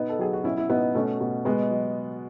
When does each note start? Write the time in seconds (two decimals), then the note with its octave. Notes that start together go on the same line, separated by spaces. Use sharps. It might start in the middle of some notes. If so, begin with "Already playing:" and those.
Already playing: B2 B3 D#4
0.09 A4
0.19 F#3 G#4
0.33 F#4
0.44 B2 C#4 E4
0.57 E4
0.69 B2 B3 D#4
0.95 B2 A3 C#4
1.21 B2
1.45 B2 G#3 B3
1.70 F#3